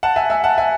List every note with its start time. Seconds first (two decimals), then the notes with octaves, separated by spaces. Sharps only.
0.03 F#5 A5
0.16 E5 G#5
0.30 E5 G#5
0.44 F#5 A5
0.58 E5 G#5